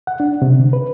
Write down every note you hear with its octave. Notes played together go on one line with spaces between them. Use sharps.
F#5
D4
C3
D3
B4